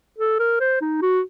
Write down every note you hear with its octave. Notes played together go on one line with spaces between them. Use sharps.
A4
A#4
C5
D#4
F#4